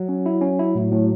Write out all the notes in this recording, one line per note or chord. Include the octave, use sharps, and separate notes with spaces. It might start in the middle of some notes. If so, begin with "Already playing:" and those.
Already playing: F#3
C#4
E4
C#4
E4
A2
A2